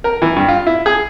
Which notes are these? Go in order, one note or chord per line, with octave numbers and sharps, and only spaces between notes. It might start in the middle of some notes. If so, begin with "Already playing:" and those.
A#4
E3
G2
F4
E4
G#4